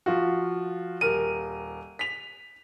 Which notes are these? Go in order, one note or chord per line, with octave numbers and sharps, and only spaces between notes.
F3 F4 F#4
D#1 A#4 D#7
B6 F7